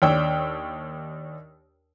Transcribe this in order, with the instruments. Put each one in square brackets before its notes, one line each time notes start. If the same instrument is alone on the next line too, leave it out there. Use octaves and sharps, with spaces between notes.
[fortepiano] D#2 D4 C#5 G5 E6